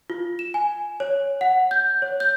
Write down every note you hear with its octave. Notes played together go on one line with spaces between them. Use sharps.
F4
E7
G#5
C#5
F#5
G6
C#5
G6